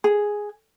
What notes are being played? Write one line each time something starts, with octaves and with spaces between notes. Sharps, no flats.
G#4